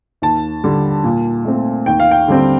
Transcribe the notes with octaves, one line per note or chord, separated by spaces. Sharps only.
D#2 A5
D3 G3
A#2
A3 C4
D#2 G5
F5
G5
D3 G3 C4